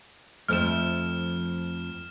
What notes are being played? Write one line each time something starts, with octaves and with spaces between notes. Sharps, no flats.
F2 F3 A3 F6 E7